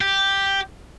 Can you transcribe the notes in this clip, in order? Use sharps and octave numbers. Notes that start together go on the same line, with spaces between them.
G4